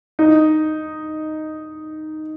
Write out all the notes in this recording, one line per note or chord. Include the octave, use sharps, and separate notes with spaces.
D#4